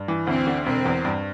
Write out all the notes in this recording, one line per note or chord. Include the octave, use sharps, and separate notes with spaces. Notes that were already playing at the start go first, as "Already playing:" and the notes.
Already playing: G2
E3
D2 C4
D3
E1 C4
E2
G2